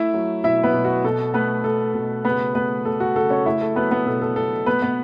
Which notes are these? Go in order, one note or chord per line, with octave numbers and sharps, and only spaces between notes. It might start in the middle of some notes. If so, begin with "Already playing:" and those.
Already playing: A3 E4 E5
F#3
B2 E4 E5
B3 B4
B2
F#4
B2 A4
A3 B3 B4
A3 A4
B2
C#3 B3 B4
A3 B3 B4
A3 A4
F#4
C#3 A4
C#4 C#5
A3 E4 E5
A4
F#3 B3 B4
B3 B4
B2 A4
A4
B2 A4
A3 B3 B4
B3 B4